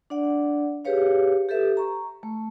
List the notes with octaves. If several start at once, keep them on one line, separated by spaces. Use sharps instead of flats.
D4 D5 F#5
G4 G#4 B4 C#5 F5
G4 A4 B4 E5
A#5 C#6
A3